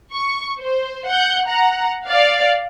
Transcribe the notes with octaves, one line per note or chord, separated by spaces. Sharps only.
C#6
C5
F#5 G6
F#5 A#5
D5 F5